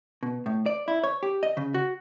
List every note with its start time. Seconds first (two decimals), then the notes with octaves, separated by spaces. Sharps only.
0.23 B2
0.46 A2
0.66 D5
0.88 E4
1.04 C#5
1.23 G4
1.43 D#5
1.57 C#3
1.74 F#4